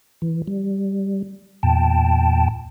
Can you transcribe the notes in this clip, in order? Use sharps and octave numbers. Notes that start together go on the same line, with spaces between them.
E3
G3
E2 A#2 G5 A5